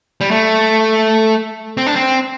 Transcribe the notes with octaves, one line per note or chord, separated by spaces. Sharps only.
G3
A3
C4
D4
C4